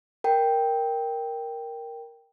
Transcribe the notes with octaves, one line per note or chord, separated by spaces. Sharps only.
A#4 G5